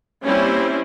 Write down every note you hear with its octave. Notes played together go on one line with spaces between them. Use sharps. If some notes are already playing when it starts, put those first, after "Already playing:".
G3 A#3 C4 C#4 E4